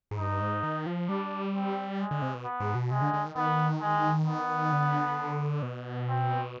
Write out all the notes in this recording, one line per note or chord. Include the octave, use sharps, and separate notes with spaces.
G#2
G2 D#4
G#2
D#3
F3
G3 D4
C4
G#3
D3
C3
B2
B3
G#2
B2
C3 G#3
D3
D3
D#3
D#3 B3
G#3
B3
D3
B2
C4